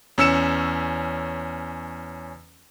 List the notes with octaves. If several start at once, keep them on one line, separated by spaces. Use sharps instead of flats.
E2 C#4 E6 C#7 E7